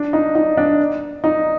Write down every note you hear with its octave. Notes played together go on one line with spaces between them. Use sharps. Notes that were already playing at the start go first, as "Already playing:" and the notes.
Already playing: D4
D#4
D#4
D4
D#4